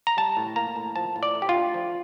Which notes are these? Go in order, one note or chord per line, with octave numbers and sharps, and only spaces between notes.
A#5
G3 A5
A2
A#3 A#5
A2
F3 A5
A2
D5
A3
G4
F4
D4
F3